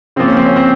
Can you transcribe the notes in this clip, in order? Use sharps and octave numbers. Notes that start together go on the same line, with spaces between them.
C#3 F3 A#3 C4
C#4
C4
C#4
C4